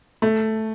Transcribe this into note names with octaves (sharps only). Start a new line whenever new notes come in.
A3